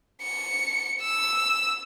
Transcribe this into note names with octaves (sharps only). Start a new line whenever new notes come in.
C#7
E6